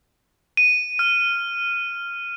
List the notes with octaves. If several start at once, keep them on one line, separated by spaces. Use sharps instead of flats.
D#7
F6